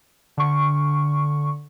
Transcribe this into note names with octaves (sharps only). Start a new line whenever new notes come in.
D3 C#6